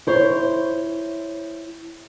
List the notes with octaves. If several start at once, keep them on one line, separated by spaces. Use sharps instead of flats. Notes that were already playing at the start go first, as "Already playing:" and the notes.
E4 C5 C#5